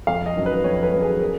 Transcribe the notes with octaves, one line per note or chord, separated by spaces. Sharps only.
F2 F5
D#5
D#3 F#3 C#4
B4
F2 C#5
B4
D#3 F#3 C#4
G#4
A#4